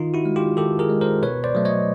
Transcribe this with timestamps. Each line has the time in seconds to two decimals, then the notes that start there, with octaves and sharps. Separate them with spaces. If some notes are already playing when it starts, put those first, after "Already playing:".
Already playing: D#3 D#4 F4
0.14 E4 F#4
0.25 G#3
0.36 F4 G4
0.57 D#3 G4 A4
0.79 G#4 A#4
0.90 G#3
1.01 A#4 C5
1.23 B2 B4 C#5
1.44 C5 D5
1.55 F#3 A3
1.65 C#5 D#5